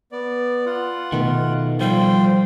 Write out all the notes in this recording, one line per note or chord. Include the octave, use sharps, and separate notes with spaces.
B3 D5
F4 F#5
B2 D#3 A3 B3
F3 G3 C5 G5